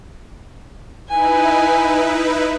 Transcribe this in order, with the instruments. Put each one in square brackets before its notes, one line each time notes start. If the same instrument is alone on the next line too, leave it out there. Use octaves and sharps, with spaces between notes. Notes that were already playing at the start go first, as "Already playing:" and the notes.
[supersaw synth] D#4 E4 B4 [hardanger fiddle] G#5